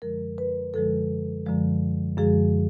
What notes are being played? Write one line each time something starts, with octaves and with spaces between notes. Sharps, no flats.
F#2 D3 F3 G#3 A#4
B4
F#2 D3 F3 G#3 A4
F#2 D3 F3 G#3
F#2 D3 F3 G#3 G#4